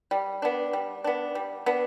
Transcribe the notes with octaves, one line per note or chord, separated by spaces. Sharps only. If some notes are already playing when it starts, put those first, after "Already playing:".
G3
B3 D4
G3
B3 D4
G3
B3 D4